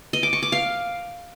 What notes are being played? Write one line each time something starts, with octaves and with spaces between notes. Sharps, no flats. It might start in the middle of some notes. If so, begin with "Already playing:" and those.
D#5
D6
C#6
D6
F5